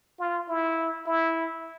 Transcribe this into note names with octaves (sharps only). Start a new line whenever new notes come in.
F4
E4
E4